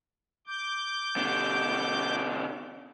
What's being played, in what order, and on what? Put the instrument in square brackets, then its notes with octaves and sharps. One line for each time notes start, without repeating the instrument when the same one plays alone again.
[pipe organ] D6 G6
[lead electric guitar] B2 D3